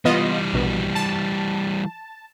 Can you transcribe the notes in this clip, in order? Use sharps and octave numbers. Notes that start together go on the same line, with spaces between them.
E3 G3 B3 F4 D#5
A#1 B2
A5